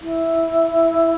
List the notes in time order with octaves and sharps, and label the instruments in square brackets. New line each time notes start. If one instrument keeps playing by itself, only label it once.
[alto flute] E4